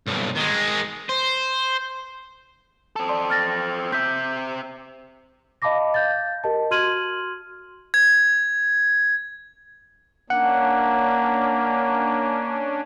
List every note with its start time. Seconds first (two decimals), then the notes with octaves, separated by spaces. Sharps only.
0.07 B1 G2
0.36 D#3 G#3
1.09 C5
2.96 C4 A4
3.09 D5 C6
3.30 F6 A6 A#6
3.92 C4 E5 G6 B6
5.62 D#5 F5 A5 B5 D6 A#6
5.94 F5 G6 A6
6.44 G4 A#4 D#5 A5
6.71 F#4 C6 F6 G#6 D#7 F#7
7.94 G#6
10.30 A#3 C#4 D4 F#5